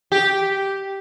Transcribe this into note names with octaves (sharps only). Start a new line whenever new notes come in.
G4